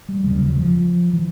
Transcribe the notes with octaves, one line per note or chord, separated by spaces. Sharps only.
G3
F1 D#2 C#3 G3
F#3
F3
F3
E3